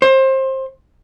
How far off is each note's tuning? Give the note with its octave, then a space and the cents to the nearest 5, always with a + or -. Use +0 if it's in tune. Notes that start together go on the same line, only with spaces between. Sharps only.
C5 +25